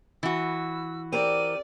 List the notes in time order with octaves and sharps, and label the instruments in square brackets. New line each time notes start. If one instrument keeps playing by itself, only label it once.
[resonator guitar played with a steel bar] E3 F#4 [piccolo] E6
[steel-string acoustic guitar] C4 G4 A#4 [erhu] D5 [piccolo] D#7